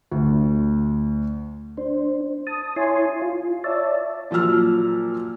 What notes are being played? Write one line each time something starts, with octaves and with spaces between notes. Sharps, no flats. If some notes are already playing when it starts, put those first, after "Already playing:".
D2
D4 C5
A5 D#6
E4 C#5 G#5 C6
F4
C#5 D5 E5 A5
A#2 F3 F#3 E6 F6